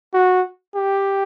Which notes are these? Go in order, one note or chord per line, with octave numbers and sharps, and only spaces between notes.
F#4
G4